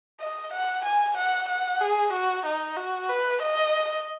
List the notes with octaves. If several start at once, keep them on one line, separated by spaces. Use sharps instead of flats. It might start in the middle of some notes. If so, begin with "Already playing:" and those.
D#5
F#5
G#5
F#5
F#5
G#4
F#4
D#4
F#4
B4
D#5